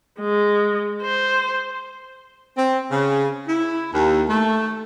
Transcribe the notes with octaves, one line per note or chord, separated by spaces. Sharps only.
G#3
C5
C4
C#3
E4
D#2
A3